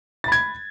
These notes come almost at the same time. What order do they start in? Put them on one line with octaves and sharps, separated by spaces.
A6 B5 G#6